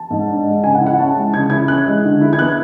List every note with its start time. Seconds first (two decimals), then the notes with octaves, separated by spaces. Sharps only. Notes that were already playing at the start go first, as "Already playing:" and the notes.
Already playing: A5
0.11 G#2
0.28 D4
0.46 G#3
0.63 C#3 G#5
0.75 F#5
0.81 E4
0.86 F#5
0.98 C#4 A5
1.16 G#3
1.34 C#3 G#6
1.50 E4 G#6
1.68 C#4 F#6
1.86 G#3
2.04 D3
2.21 E4
2.33 G#6
2.39 B3 F#6